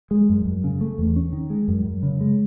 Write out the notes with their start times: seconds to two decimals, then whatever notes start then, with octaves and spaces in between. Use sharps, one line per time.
0.11 G#3
0.29 F#2
0.46 F#2
0.64 C#3
0.81 A3
0.98 E2
1.16 C#4
1.33 D#3
1.50 G#3
1.68 F#2
1.85 F#2
2.03 C#3
2.21 G#3